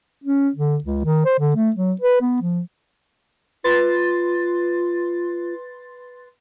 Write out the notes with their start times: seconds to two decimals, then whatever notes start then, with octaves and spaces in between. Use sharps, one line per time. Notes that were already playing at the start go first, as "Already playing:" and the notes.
0.24 C#4
0.55 D3
0.84 C#2
1.05 D#3
1.25 C5
1.39 D3
1.56 A3
1.76 F#3
2.01 B4
2.21 B3
2.42 F3
3.64 F4 B4 C6 A6